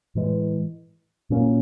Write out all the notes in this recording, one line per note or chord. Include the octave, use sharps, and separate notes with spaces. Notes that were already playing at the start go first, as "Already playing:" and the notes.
A2 E3 G#3
A#2 F#3 A#3 C#4